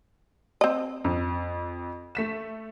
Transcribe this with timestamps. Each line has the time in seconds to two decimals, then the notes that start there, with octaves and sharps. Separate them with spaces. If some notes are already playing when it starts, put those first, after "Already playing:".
0.61 C4 D#5
1.04 F2
2.15 A3 B6 E7